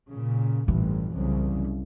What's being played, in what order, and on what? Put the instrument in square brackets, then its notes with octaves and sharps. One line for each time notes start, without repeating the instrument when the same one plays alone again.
[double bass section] A#2 C#3
[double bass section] A1 G2 A#2 [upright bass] E3
[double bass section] C2 F#2 C#3